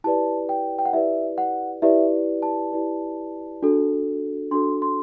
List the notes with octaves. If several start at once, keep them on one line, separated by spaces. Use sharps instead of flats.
E4 G4 B4 D5 A5
G5
G5
F#5
E4 G4 B4 D5 E5
F#5
E4 G4 B4 D5 E5
A5
E4 G4 B4 D5
D4 F#4 A4
D4 F#4 A4 C6
C6